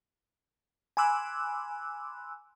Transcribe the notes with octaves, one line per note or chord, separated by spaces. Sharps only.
G#5 B5 C6 D6 E6 F#6